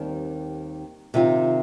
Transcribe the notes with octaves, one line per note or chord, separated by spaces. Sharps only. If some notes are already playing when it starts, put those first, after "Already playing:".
Already playing: D#2 D#3 G3 C4
C3 D#3 C4 F4